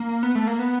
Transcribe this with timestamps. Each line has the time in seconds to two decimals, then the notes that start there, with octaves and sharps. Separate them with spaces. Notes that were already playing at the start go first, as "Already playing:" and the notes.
Already playing: A#3
0.23 B3
0.35 A3
0.47 A#3
0.59 B3